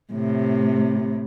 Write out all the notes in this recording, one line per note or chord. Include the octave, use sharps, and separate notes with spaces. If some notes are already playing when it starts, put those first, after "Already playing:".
A2 C3